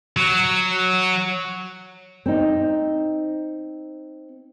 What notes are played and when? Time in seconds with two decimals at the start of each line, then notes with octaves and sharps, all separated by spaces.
0.17 F#3
2.26 C4 D#4